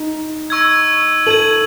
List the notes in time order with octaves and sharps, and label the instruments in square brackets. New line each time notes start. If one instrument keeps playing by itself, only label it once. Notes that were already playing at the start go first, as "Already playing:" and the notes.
Already playing: [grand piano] D#4
[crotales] C#6 E6 G#6
[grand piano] A4 [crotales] G#6 D#7 F#7